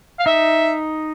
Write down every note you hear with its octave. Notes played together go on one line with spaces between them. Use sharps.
F5
D#4 E5